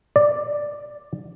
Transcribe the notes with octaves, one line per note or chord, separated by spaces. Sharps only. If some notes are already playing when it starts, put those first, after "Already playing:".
D5